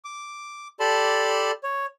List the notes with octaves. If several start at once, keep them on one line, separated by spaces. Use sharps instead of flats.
D6
G4 A4 D5 A5 B5 C6
C#5